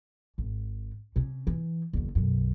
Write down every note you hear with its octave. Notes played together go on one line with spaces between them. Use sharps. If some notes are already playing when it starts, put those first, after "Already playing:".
G#1
C3 C#4
E3
F#1 E2
B1 F#2